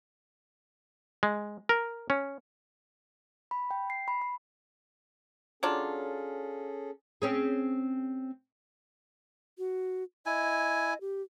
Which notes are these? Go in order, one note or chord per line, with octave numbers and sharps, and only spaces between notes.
G#3
A#4
C#4
B5
G5
C7
B5
B5
F#3 C#4 D4 F4 G#4 A4
C4 C#4 G#4
F#4
E4 D#5 G#5
G4